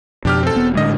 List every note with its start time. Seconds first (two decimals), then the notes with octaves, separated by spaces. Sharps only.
0.25 F2 B2 D4 G4 F6
0.43 C4 A4
0.55 E1 B3
0.75 G#1 A2 D3 G#3 D#5